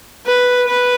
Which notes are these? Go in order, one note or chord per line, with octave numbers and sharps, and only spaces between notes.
B4
B4